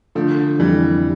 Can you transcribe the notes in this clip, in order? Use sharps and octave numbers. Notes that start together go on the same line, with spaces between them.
D3 F3 A3
F2 E3 G3